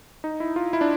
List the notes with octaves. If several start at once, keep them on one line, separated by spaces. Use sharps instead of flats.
D#4
E4
F4
E4
D4